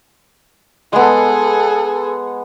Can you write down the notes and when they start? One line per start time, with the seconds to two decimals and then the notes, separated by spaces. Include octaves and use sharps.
0.93 G#3 B3 G#4 A4